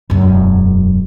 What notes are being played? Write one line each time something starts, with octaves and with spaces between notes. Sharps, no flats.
E1 F#2